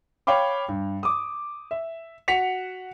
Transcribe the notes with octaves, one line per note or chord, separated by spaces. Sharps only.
C#5 F5 G5 B5 D6
G2
D6 D#6
E5
F#4 F#5 B6 C#7 F7